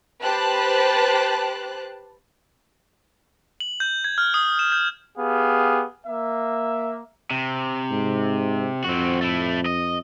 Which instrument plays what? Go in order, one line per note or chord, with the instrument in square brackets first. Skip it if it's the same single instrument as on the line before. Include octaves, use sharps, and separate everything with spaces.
[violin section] G4 B4 C5 A5 F#6
[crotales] F#7
G6
G#6
F6
D#6
E7
G6
[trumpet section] B3 G4 G#4 F5
A#3 E5
[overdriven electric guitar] C3
[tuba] G#2
[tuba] F2 [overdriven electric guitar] C4 F#4
[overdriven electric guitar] A3 E4
D#5